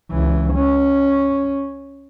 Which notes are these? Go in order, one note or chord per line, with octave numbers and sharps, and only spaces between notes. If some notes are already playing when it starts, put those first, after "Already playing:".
C#2 E3
C#4